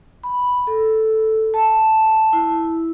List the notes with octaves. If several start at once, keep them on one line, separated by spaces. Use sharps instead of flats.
B5
A4
A5
E4